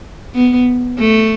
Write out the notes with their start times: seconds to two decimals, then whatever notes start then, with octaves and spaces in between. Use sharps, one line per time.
0.35 B3
0.99 A3